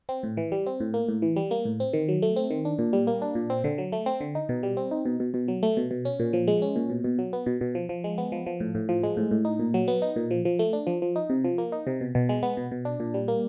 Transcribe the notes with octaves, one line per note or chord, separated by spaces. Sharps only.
C4
A2
E3
G3
C4
A2
A#3
A2
E3
G3
A#3
A2
C4
D#3
F#3
A3
C4
D#3
D4
A#2
G3
A#3
D4
A#2
C4
D3
F#3
A3
C4
D3
D#4
B2
G3
C4
D#4
B2
B2
B2
F#3
A3
B2
B2
C#4
A#2
F3
G#3
C#4
A#2
B2
B2
F#3
B3
B2
B2
F3
F3
G#3
B3
F3
F3
A2
A2
F3
G#3
A2
A2
D#4
A#2
F#3
B3
D#4
A#2
F3
F3
A3
D4
F3
F3
D#4
C3
F3
A#3
D#4
C3
B2
B2
G#3
B3
B2
B2
D4
A#2
G3
A#3